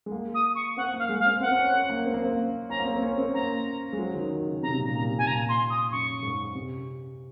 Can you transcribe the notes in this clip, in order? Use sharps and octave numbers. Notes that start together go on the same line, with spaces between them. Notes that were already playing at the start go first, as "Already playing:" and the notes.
G#3
A#3
D#6
C#6
C4 F#5
A#3 F5
G#3
F5
C4
C4 F#5
C4
C#4
C4
A#3
C4
A#3
C4
C#4 A#5
A#3
C4
C4
C#4
C4
A#3 A#5
G#3
F#3
D#3
D#3
C#3
C3 A#5
C3
A#2
C3
A#2 A#5
C3
G#5
A#2 A#5
C6
D#6
F#2 C#6
F#2
G#2
C3